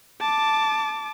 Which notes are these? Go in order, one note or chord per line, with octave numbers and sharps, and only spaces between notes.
A5 D6